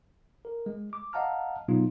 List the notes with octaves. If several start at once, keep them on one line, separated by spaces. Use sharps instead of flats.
A#4
G#3
D6
D#5 F5 F#5 A5 A#5 F6
B2 F#3 B3 D#4 F4